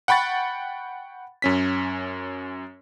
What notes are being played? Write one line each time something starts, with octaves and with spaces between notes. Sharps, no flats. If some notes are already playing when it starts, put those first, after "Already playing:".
F#5 G5 B5 C#6 A6
F#2 C#4 B6